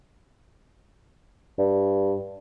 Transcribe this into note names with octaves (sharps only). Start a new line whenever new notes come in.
G2